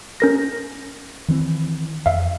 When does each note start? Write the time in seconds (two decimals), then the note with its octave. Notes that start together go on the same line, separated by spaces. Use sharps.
0.20 C#4 A#4 A#6
1.28 D#3 E3 C4
2.06 F2 E5 F5